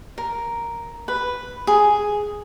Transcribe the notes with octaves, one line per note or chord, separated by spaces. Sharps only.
A#4
B4
G#4